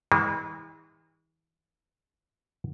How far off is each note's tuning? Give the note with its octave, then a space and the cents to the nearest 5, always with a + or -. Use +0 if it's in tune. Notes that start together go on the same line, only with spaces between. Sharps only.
E3 -40 G#3 -45